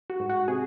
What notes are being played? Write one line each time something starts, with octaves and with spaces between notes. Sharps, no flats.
F#4
G#2
F#4
C3 G#4